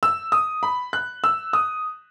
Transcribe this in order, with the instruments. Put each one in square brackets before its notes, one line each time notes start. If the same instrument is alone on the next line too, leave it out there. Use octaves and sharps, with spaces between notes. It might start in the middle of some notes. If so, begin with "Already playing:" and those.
[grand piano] E6
D#6
B5
F#6
E6
D#6